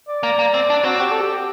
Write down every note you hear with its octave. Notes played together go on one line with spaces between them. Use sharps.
D5
A#3
A#3
C4
D4
C4 F#4
G4
A4
G4